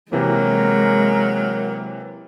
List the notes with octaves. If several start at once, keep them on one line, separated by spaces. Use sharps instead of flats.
C3 E3 F#3 G#3 A#3 A#4